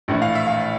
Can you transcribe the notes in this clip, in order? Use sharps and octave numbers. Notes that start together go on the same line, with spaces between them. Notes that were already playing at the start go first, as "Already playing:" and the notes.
A#1 A2 E3
F5
E5
F5